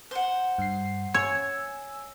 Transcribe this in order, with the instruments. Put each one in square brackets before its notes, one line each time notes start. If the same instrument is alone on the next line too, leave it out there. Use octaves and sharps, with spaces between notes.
[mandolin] C5 F#5
[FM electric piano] G2 C7
[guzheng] C#5 [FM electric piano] G#5 E6